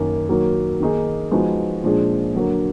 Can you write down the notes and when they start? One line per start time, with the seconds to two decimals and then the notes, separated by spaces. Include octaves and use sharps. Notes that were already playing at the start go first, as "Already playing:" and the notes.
Already playing: F#2 D#3 A#3
0.29 D#3 F#3 A#3
0.80 D#3 A#3 D#4 G#4
1.31 F3 G#3 B3 D#4 F#4
1.84 A#2 F3 G#3 D4 G#4
2.35 D3 F#3 A#3